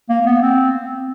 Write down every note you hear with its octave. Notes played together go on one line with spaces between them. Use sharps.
A#3
A#3
B3
C4